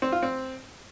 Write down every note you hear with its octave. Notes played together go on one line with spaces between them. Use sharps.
C4
F4
C4